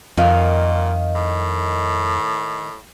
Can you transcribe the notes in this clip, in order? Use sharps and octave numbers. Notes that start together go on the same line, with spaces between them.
F2 A#2 D#3 F5
A2